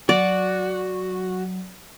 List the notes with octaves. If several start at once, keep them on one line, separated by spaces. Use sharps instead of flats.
F#3 F#4 D5